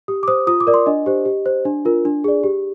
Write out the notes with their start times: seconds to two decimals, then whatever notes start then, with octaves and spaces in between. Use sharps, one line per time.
0.08 G4 D#6
0.23 D6
0.28 C5 D#6
0.47 F4 D#6
0.60 D6
0.67 A#4 D5
0.74 C6
0.86 D4 D#5
1.06 G4 C5
1.25 G4
1.46 C5
1.65 D4
1.85 F4 A#4
2.05 D4
2.24 G#4 D5
2.44 G4